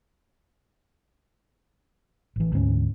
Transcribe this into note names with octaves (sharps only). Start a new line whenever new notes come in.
A1 E3
D2 G#2 B3 C#4